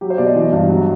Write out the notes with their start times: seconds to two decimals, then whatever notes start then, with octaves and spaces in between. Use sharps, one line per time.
0.01 F#3 G4
0.10 C5
0.18 B2 D5
0.27 D#5
0.36 E3
0.52 G2
0.69 F#3